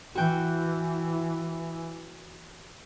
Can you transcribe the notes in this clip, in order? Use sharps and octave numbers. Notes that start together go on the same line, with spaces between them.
E3 F#4 G5